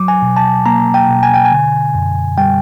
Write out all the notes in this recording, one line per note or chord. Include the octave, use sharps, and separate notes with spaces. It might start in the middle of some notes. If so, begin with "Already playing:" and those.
Already playing: F#3 D6
G#5
B2
A5
A#3 A#5
G5
B2
G#5
G5
G#5
D3
F#2
G3 G5